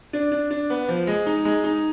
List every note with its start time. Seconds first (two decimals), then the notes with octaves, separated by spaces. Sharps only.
0.13 D4
0.32 D4
0.51 D4
0.70 B3
0.88 F3
1.07 G#3
1.26 D#4
1.45 G#3
1.64 D#4